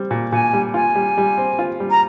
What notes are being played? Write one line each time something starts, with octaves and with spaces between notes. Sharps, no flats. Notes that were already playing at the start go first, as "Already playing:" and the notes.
Already playing: G3 C4
A#2
A#2 G#5
G3
F4 G#5
G3
G3
C4
F4
G3
A#5